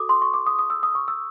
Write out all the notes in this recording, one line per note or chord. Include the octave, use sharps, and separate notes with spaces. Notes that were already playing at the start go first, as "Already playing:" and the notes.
Already playing: F#4 A4 D6 D#6
C6
C#6
D6
D#6
D#6
E6
D#6
C#6
E6